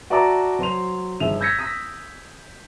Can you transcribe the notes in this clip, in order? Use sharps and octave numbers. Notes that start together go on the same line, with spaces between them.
F#4 D5 E5 A5 A#5 D6
F#3 C5 C6 F7
G1 D#3 F3 G#4 E5 F7
E6 G6 G#6 A#6 B6 C#7
D#6 E6 A#6 B6